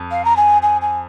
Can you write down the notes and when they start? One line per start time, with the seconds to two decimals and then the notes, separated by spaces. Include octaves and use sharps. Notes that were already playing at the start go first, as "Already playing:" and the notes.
Already playing: F2
0.11 F5
0.25 A#5
0.37 G#5
0.62 G#5
0.82 G#5